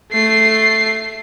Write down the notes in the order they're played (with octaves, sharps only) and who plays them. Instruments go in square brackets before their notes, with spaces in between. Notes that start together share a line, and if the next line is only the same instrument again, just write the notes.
[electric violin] A3 C7